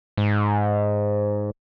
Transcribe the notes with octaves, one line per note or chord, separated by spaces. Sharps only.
G#2